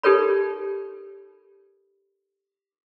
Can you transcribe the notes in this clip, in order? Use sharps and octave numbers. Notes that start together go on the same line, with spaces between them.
D#4 G4 A4 A#4 C#5 B5